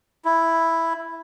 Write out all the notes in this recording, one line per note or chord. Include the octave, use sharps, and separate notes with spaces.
E4